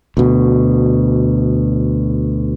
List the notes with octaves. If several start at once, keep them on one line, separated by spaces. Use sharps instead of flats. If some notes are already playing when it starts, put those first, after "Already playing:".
D2 B2